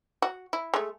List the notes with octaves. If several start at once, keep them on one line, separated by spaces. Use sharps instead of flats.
F#4
E4
G#3 A3